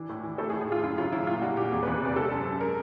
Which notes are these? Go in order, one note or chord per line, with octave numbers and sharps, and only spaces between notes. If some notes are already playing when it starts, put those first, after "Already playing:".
Already playing: E3 D4
A2
E3
A2 A4
G#4
A2
G#4
A2 F4
F#2 E4
C#3 F4
F#3 E4
A#2 F4
G3 F#4
A#2 G4
E2 G#4
B4
E2
C3 D5
G#3 A4
F#2
F#2
G#3 A#4